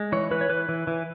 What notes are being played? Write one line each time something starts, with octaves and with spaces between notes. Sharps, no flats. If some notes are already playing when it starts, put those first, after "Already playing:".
Already playing: G#3
E3 C#5
E3 B4
C#5
E3 B4
E3
E3